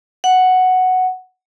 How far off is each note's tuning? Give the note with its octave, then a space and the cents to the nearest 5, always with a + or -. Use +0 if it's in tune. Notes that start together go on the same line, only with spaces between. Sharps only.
F#5 +0